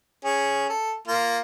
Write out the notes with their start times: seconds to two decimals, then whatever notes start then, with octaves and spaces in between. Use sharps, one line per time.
0.25 C#4 G#4
0.69 A4
1.07 A#3 F4